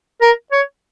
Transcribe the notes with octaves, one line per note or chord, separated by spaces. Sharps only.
A#4
C#5